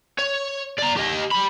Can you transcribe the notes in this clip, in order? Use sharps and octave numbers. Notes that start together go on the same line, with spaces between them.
C#5
D5 A#5
G4 D#5
G3 B5